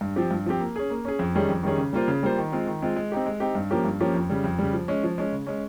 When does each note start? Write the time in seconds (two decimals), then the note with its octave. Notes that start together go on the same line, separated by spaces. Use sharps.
0.01 G2
0.16 F3 C4 G4
0.31 G2
0.46 F3 C4 G4
0.60 A#3
0.76 C#4 G#4
0.90 A#3
1.05 C#4 G#4
1.19 F2
1.35 D#3 G3 C#4 G#4
1.49 F2
1.63 D#3 G3 C#4 G#4
1.78 C#3
1.93 G3 A#3 F4 C5
2.08 C#3
2.23 G3 A#3 F4 C5
2.38 D#3
2.52 G#3 C4 F4
2.67 D#3
2.82 G#3 C4 F4
2.96 G#3
3.12 C4 D#4 G4
3.26 G#3
3.40 C4 D#4 G4
3.55 G2
3.70 F3 A#3 C#4 G4
3.85 G2
4.00 F3 A#3 C#4 G4
4.14 F2
4.30 C#3 G3
4.44 F2
4.59 C#3 G3
4.73 F3
4.88 G#3 C#4
5.03 F3
5.18 G#3 C#4
5.33 C#3
5.47 G#3 C#4